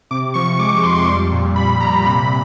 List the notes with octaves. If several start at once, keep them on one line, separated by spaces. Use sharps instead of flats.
C3 D6
F3 C#6
G#3 D6
C#6
F2 C6
C6
G3
A#2
G3 B5
A#2 A#5
C3 B5